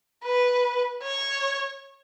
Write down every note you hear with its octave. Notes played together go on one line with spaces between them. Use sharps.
B4
C#5